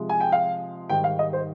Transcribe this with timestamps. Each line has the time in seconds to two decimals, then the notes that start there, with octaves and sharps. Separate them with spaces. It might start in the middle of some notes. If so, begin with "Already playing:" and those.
Already playing: C3 F3 G#3
0.09 G#5
0.20 G5
0.32 F5
0.89 G#2 D#3 G3 G5
1.04 F5
1.19 D#5
1.33 C5